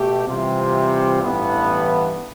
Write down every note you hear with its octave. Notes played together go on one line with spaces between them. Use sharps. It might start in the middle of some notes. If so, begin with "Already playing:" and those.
Already playing: B2 A3 G4
C3 E3 G3 C4 F4
A1 G2 E3 B3